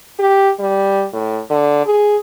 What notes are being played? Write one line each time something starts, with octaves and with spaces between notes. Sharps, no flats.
G4
G3
A2
D3
G#4